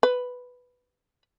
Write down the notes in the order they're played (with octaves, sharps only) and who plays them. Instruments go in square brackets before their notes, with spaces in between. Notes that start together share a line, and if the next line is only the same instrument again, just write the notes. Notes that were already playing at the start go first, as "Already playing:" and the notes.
[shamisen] B4